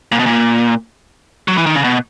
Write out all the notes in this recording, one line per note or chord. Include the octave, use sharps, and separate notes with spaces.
A#2
B2
A#2
F#3
E3
D#3
C#3
B2